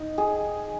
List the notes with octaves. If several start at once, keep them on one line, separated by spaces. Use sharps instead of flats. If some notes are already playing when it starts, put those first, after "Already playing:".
Already playing: D#4
G#4